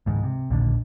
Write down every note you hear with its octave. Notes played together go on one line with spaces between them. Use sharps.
C#2 G#2 D#3
C3
A#1 D#2 A#2 D3